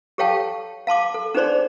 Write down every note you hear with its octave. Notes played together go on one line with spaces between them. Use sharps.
G4 A4 C#5 F5 G5 A5
F5 A5 C6 D6
A4
D4 D#4 G#4 C5 D5 C6